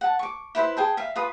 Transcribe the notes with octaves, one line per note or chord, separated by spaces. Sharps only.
F#5 A5
C#6 D6
E4 B4 C5 E5
G#4 G5 A5
E5 F5
F4 B4 D#6